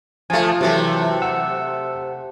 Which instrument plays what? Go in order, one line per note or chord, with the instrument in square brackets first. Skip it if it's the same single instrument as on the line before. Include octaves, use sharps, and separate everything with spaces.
[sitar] F3 A3 [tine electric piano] F4 G#5
[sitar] C3 A3 [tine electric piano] E3 F#3
[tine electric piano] F#5 E6